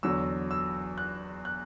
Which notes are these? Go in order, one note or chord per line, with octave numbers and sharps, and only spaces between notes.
E2 D3 F#3 E6
E6
F#6
F#6